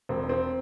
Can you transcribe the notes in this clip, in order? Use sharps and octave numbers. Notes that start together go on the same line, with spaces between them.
E1 C4
E1
C4